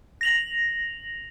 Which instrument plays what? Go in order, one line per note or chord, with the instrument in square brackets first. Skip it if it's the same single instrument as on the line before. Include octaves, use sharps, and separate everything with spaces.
[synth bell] A#6 F7 F#7